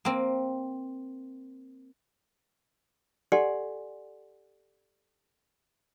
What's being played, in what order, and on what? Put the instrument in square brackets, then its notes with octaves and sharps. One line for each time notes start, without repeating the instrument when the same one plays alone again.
[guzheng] A#3 C4
[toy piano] G4 A4 D5 F#5 G#5 C6